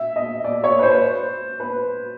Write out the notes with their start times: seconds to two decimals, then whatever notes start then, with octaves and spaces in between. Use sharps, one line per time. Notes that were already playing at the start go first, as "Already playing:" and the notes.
Already playing: E5
0.16 D#5
0.44 D5
0.64 C#5
0.79 B4
0.83 C5
1.60 B4